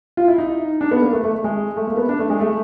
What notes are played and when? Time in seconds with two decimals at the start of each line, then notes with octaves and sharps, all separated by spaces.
0.17 F4
0.28 E4
0.38 D#4
0.81 D4
0.91 B3
1.02 A#3
1.13 A3
1.24 A3
1.34 A3
1.44 G#3
1.77 A3
1.87 A#3
1.97 B3
2.09 D4
2.19 A3
2.30 G#3
2.40 A3